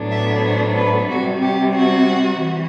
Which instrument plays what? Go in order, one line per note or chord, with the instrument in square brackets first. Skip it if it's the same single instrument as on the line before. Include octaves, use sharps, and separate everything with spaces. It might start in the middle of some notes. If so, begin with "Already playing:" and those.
Already playing: [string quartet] A2 F#3 B3 D4
E5
C5
B4
C3 G3 C4 F#4
G4
F#4
E3